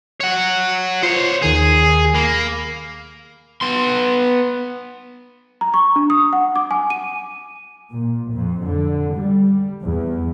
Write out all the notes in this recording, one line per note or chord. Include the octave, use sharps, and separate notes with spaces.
C#5 F#5
F4 C5 C#5
D#2 D#3 G#4 A#4
A#3 B5
B3 C6
A#5
C#6
D4
D#6
F#5
D6
G#5
D#7
A#2
F2
D3
G3
E2